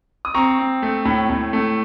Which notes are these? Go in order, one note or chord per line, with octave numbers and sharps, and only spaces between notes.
D#6
C4 A#5 C#6
C4
A3
A2
A2
A3